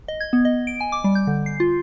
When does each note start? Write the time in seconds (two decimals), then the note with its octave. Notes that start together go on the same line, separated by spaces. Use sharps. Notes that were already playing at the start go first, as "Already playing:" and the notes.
0.08 D#5
0.20 G#6
0.33 B3
0.45 D#5
0.67 D7
0.81 G#5
0.92 D6
1.04 G3
1.15 G6
1.27 D3
1.46 C7
1.60 F4